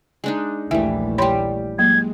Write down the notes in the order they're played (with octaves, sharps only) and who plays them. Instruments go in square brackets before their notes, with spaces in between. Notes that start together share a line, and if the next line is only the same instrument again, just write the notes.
[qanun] G#3 D4 D#4
[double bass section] A#1 D#2 A3 [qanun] E3 G3 [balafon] E5
[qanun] G3 G4 [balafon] C#5 B5 C6
[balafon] F#3 A#3 [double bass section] G#3 [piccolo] G#6